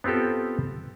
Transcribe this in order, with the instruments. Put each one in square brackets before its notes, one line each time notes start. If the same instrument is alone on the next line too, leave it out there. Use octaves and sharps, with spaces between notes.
[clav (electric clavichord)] B3 C4 F4 G4 A4